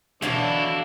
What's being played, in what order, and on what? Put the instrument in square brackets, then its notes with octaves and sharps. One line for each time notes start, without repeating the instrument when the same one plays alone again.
[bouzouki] B2 D3 C#5 [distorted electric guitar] E3 E4 [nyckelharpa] D4 [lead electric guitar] A4 F5